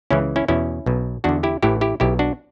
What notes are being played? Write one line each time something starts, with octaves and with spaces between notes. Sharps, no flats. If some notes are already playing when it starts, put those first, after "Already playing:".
C#2 C#3 E3 C#4 E4
C#4 E4
E2 B2 C#4 E4
B1 B2
E2 D3 D4 F#4
E4 G4
A1 A2 E3 E4 G4
E4 G4
B1 B2 E4 G4
D4 F#4